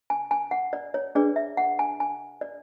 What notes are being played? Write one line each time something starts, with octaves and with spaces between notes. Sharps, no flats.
G#5
G#5
F#5
D5
C#5
D4 G#4 B4 D5
E5
F#5
G#5
G#5
D5